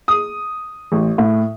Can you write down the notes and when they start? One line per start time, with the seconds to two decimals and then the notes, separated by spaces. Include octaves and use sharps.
0.08 D#6
0.92 A1
1.18 A2